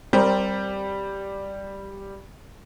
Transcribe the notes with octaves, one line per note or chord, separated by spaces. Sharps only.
G3 C4 G4 A#4